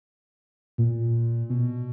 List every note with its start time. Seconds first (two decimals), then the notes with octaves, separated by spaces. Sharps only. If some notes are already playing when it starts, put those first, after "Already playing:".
0.78 A#2
1.50 B2